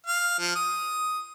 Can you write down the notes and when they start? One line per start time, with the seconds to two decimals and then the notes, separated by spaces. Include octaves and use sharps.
0.06 F5
0.39 F3
0.55 D#6